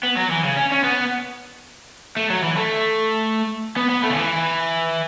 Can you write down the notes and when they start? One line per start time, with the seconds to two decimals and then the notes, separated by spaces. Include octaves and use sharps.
0.03 B3
0.17 F#3
0.31 E3
0.44 C#3
0.57 C#4
0.72 C#4
0.84 B3
2.17 A3
2.30 F#3
2.43 E3
2.57 A3
3.76 B3
3.90 B3
4.04 A3
4.11 C#3
4.17 E3